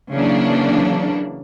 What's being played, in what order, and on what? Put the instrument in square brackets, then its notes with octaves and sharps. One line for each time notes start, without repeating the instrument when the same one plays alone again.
[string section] C#3 E3 F#3 A#3 D4